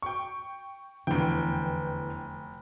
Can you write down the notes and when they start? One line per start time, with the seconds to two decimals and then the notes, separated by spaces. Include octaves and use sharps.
0.02 G5 C#6
1.07 F1 E2 D3 G5